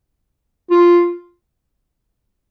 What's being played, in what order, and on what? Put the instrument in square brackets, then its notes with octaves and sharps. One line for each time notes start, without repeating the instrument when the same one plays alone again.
[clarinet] F4